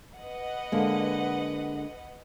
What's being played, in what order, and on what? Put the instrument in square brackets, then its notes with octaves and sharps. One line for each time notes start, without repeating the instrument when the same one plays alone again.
[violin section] B4 D#5 F#5
[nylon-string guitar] D3 G#3 A#3